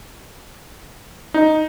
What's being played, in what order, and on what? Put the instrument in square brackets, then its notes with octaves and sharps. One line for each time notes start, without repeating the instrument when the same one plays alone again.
[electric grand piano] D#4